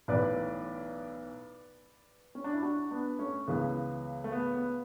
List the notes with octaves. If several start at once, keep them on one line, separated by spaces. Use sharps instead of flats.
B1 A2 E3 B4 D5
C#4
D4
E4
D4 F#4
B3 D4
A3 C#4
C#2 C#3 E3 B3
A3
B3
B3